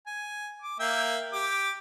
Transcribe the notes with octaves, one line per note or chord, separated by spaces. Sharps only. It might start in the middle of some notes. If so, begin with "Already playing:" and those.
G#5
D6
A#3 E5 G5
G4 D6